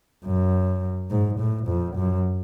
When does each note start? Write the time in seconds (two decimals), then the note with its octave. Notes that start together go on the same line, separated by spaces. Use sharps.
0.25 F#2
1.11 G#2
1.40 A2
1.68 F2
1.96 F#2